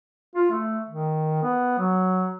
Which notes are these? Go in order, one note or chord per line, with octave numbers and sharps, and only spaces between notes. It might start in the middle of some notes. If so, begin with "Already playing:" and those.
F4
A3
D#3
B3
F#3